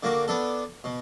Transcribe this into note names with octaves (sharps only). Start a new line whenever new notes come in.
D3 A#3 F#4 D6
B3 D4 A4
B2